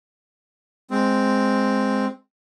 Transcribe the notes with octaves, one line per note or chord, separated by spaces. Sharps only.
G#3 C4